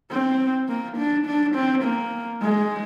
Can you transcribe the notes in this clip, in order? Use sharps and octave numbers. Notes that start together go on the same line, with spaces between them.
C4
A#3
D4
D4
C4
A#3
G#3